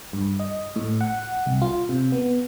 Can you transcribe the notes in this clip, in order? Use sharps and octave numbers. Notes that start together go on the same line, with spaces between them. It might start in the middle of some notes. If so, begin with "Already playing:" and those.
G2
D#5
A2
F#5
C2
F4
C3
B3